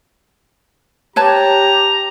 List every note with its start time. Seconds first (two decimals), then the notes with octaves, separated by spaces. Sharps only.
1.16 G4 B4 C#5 A5 A#5